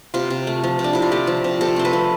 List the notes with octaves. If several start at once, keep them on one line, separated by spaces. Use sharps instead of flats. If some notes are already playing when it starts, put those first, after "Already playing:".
C3 F4
C3
A3
F3
C3
D4
C3 E4
F4
A3 G4
F3
C3
C3 A4
A3 C5
B4
F3